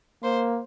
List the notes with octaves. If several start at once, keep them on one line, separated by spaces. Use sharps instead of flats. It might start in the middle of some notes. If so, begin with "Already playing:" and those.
A#3 C5